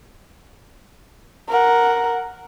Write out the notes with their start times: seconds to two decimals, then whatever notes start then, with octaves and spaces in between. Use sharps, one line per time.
1.48 A#4 F#5